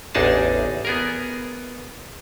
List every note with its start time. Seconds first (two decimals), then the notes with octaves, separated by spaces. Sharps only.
0.15 A1 E2 D4 D#4 G#4 A5
0.85 B3 G#4 A#4